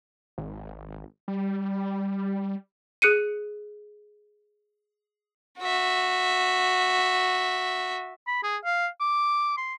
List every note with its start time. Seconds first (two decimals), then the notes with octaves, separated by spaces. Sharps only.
0.38 G#1
1.28 G3
3.02 G#4 F#6 C#7 D#7
5.59 F#4 E5
8.27 B5
8.43 G#4
8.65 F5
9.00 D6
9.57 C6